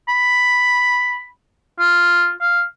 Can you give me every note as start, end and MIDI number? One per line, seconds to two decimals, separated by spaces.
0.08 1.27 83
1.79 2.31 65
2.41 2.62 77